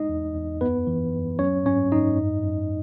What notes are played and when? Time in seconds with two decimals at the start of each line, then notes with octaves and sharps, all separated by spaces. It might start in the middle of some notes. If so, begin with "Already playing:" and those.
Already playing: G#3 D#4 D#5
0.09 E2
0.35 E2
0.61 F#2 B3 B4
0.87 E3
1.13 F#2
1.39 F#3 C#4 C#5
1.65 G#2 C#4 C#5
1.92 G#2 D#4 D#5
2.17 F#2
2.43 F#2